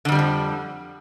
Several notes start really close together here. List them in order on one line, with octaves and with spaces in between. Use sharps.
D3 F2 G3 E3 F3